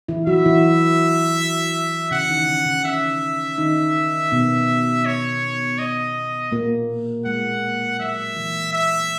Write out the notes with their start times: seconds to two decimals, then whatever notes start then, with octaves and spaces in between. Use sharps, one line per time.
0.08 E3 E4
0.27 F#3 F#4 E5
0.45 E3 E4
2.11 C#3 C#4 F#5
2.29 D#3 D#4
2.48 C#3 C#4
2.66 C#3 C#4
2.84 C#3 C#4 E5
3.58 D#3 D#4
4.32 B2 B3
5.06 C#5
5.79 D#5
6.52 A#2 A#3
7.26 G#3 F#5
8.00 F#3 E5
8.36 E3
8.73 E5